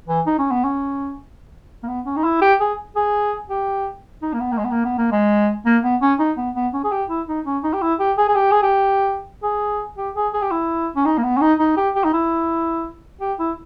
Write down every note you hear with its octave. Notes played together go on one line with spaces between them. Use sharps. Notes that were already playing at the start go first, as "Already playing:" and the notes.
E3
D#4
C#4
B3
C#4
A#3
B3
C#4
D#4
E4
G4
G#4
G#4
G4
D#4
A#3
B3
A#3
G#3
B3
A#3
B3
A#3
G#3
A#3
B3
C#4
D#4
B3
B3
C#4
G#4
G4
E4
D#4
C#4
D#4
G4
E4
G4
G#4
G#4
G4
G#4
G4
G#4
G4
G#4
G#4
G4
E4
C#4
D#4
A#3
B3
C#4
D#4
D#4
G4
G4
D#4
E4
G4
E4